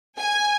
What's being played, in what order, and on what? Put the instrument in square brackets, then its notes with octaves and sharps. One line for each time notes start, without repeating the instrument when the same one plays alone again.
[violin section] G#5